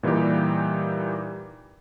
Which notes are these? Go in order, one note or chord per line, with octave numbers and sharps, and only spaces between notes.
A#2 E3 G3 D#4 G4